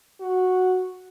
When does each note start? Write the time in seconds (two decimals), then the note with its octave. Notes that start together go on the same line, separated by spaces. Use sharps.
0.20 F#4